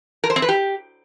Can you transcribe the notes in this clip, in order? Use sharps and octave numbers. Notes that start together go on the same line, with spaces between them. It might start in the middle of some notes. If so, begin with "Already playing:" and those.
A#4
C5
C4
B4
G4